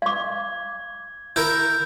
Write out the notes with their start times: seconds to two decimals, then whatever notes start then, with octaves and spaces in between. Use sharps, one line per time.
0.02 F5 D6 G#6
1.36 E4 A#4 G6